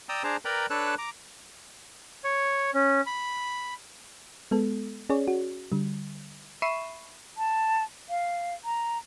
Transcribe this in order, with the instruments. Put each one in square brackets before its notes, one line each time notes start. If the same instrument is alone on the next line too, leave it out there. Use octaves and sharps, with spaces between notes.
[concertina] D5 G5 A#5 D#6 E6
D4 G#4 C5 A5 A#5
A#4 B4 D5 G5 A#5 B5
D4 A4 B4 C#5 E6 F#6
A#5 D6
[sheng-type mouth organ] C#5
C#4
B5
[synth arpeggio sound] G#3 B3 A4
C#4 G#4 C#5 D5
F#4
D3 G3
E5 B5 C#6 C7 D#7 E7
[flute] A5
F5
A#5